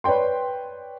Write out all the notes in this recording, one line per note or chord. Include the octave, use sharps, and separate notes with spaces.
B4 C#5 D5 G5 C6